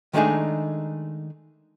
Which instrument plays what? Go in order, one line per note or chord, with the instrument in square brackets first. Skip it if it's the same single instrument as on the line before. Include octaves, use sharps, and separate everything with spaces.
[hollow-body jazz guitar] D#3 G#3 A3 D4 D#4 G#4